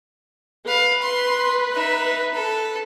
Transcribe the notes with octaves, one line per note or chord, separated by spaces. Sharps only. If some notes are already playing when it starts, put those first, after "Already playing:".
B4 F5
C6
D#4 E5
A4